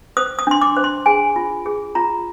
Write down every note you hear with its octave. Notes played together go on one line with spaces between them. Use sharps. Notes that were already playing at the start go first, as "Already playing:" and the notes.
C5 D#6
D#6
D4 C6
D6
C5
C6
G#4 G#5
F4
G#4
F4 A#5